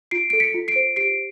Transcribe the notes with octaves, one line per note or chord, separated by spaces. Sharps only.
F4 C7 D7
A4 D7
B6 C#7
F4
C7 D7
C5
G4 C7 D7